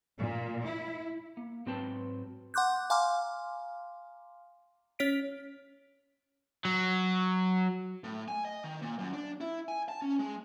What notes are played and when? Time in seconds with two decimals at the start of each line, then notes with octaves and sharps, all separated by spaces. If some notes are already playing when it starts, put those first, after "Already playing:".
0.18 A#2
0.66 E4
1.37 A#3
1.66 G#2 F#3 C4 B4 G5 A5
2.54 F#5 C6 D6 F#6 G6
2.90 F5 G#5 A#5 C6 D6 F6
4.99 C#4 C#5 B6 D7
6.65 F#3
8.04 A2
8.28 G#5
8.45 D#5
8.64 D#3
8.82 A#2
8.99 F#2
9.13 D4
9.41 E4
9.68 G#5
9.89 A5
10.02 C#4
10.19 G#3